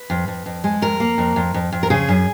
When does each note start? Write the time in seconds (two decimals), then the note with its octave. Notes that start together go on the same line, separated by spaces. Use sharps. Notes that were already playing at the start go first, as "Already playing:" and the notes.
Already playing: B4
0.10 F2
0.28 F2
0.46 F2
0.64 G#3
0.82 F2 A#4
1.00 A#3
1.18 F2
1.36 F2
1.54 F2
1.72 F2
1.83 A#4
1.90 C#3 G#4
2.09 F#2